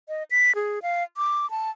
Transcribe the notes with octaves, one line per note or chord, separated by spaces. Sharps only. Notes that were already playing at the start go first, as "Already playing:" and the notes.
D#5
B6
G#4
F5
D6
A5